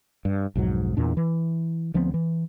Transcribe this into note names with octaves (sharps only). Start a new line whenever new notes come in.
G2
B1 F2 G#2 F#3
E2 A#2 D4
E3
D2 F3 B3 C4
E3